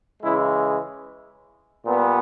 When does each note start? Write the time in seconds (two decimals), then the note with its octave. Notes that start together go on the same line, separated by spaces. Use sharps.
0.23 C#3 E3 G#3 E4
1.85 A#2 G3 B3